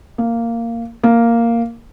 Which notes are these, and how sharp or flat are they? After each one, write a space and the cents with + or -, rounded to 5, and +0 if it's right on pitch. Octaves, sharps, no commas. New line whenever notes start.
A#3 -10
A#3 -5